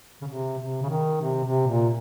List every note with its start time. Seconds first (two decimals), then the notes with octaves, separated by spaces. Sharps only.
0.22 C#3
0.27 C3
0.58 C3
0.82 C#3
0.89 D#3
1.21 C3
1.45 C3
1.68 A#2